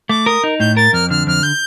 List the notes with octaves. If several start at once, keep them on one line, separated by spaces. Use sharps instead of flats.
A3 D6
A#4 D#6
D#4
A2 G6
A#4 A6
F2 F6
D3 F6
F2 F6
G6